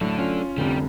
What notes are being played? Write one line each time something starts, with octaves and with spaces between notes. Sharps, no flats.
A2 F#3 G3 A3 D4 A4
C#4 F4
F1 C2 D3 G3 G4